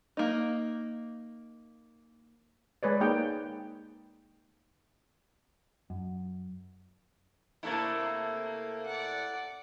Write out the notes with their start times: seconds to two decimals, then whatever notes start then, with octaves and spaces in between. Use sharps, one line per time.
0.17 A#3 D#4
2.83 G#3 B4 C#5 D5
3.00 A#3 D#4 G#4 G5
5.90 F#2
7.63 C3 A3 A#3 D4 E4
7.96 A#3 C4
8.86 D5 F#5